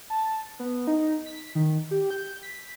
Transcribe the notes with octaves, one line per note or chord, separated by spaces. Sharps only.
A5
B3
D#4
B6
D#3
G4
G6
B6